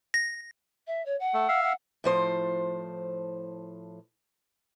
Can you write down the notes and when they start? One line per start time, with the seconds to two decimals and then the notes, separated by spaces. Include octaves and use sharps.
0.14 A#6
0.87 E5
1.05 C#5
1.19 F#5
1.34 A3
1.49 E5 F5
1.63 F#5
2.04 A2 F3 C5